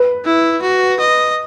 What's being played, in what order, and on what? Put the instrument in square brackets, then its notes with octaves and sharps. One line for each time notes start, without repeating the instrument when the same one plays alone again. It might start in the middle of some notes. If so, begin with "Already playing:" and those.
Already playing: [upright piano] B4
[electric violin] E4
F#4
D#5